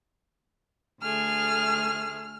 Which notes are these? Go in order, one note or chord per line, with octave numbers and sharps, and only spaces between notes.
D2 A3 G#4 F6